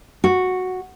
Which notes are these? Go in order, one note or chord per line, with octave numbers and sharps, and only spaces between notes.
F#4